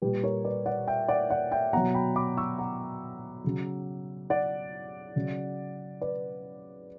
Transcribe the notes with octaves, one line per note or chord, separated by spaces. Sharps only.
A#2 G3 G4 B4
A#4 C#5
B4 D5
D5 F#5
E5 G5
D5 F#5
D5 F#5
E5 G5
B2 F#3 F#5 A#5
G5 B5
B5 D6
C#6 E6
F#5 A#5
C#3 F#3
D5 F#5
C#3 F#3
B4 D5